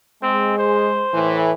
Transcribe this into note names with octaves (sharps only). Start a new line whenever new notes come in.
G#3 C4
C5
A2 E3